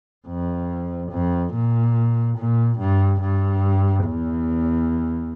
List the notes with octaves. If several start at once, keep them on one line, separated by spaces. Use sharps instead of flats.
F2
F2
A#2
A#2
G2
G2
E2